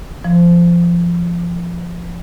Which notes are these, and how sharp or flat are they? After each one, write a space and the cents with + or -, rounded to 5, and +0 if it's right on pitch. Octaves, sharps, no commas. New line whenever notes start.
F3 -20